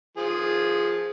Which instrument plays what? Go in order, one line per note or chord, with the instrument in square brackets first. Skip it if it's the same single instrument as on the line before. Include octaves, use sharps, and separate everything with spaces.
[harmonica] F3 G#4